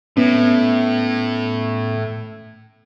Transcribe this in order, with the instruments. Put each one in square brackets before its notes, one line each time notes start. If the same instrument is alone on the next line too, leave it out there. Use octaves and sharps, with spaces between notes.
[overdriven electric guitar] A2 [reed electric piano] B3 C#4